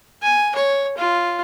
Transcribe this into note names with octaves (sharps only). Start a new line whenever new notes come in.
G#5
C#5
F4